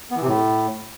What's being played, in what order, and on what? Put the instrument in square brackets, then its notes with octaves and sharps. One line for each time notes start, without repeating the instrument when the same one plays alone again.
[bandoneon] B3
E3
C3
A2